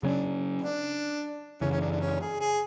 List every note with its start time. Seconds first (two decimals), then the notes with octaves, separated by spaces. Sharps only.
0.03 C#3 F#3 C#4 D4
0.62 D4
1.61 F#2 C#3 E3 C#4
1.72 C#4
1.81 D4
1.91 D4
2.01 C#4
2.21 G#4
2.40 G#4